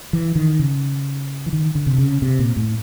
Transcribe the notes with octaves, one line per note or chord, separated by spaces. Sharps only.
E3
D#3
C#3
E3
D#3
D3
C3
C#3
C3
A#2
A2